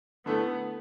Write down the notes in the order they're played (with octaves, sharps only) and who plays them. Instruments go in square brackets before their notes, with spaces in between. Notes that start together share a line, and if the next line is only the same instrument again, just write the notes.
[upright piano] D3 A3 E4 A4 [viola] B3